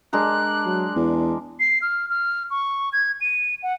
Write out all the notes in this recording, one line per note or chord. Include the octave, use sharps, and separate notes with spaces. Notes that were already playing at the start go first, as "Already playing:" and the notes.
G#3 D4 A#4 F#6
F#3
E2
C7
F6
F6
C#6
G#6
D#7
F#5